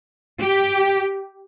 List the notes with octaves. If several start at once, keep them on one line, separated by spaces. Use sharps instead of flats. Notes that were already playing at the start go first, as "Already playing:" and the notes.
G4